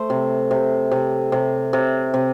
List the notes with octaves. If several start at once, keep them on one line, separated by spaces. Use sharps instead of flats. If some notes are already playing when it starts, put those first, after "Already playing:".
Already playing: A3 C5
C3
C3
C3
C3
C3
C3